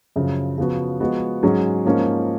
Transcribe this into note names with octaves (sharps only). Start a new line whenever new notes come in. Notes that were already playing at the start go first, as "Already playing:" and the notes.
F#2 C#3 F3
C#3 F3 B3 F#4
F3 G#3 B3 F#4
G#2 F#3 C#4 G#4
G#2 F3 A#3 C#4